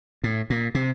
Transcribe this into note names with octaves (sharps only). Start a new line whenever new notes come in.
A2
A#2
C3